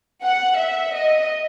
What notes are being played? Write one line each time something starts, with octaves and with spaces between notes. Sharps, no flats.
F#5
E5
D#5